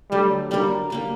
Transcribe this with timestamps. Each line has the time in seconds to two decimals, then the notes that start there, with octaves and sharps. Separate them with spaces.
0.11 D3 F#3 G3 A3
0.51 G3 A#3 D4 F#4 A#4
0.90 G3 A#3 D4